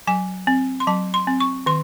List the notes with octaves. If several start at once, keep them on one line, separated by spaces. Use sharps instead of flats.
F#3 G#5
C4
C6
F#3 A5
C6
C4
C#6
D#3 C6